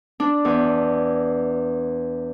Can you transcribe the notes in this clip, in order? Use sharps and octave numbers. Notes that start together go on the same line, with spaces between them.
D4
E2